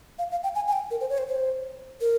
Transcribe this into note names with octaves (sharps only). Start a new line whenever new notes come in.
F5
F5
G5
G#5
G#5
G5
A#4
C5
C#5
C5
C5
A#4